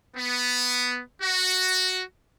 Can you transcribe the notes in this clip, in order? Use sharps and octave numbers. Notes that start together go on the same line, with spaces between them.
B3
F#4